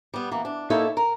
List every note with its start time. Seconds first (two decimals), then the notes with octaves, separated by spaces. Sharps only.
0.14 G3 B3
0.32 E3 A#3
0.45 D4
0.70 A#3 D#4 E4 A4 C#5 E5
0.97 A#4